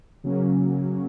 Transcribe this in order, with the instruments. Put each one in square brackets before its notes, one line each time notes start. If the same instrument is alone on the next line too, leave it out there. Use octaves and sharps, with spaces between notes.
[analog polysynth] C#3 F#3 A#3 C#4